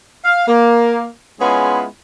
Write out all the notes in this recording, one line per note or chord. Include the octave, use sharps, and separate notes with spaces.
F5
A#3
G#3 B3 C#4 E4 F4 G#4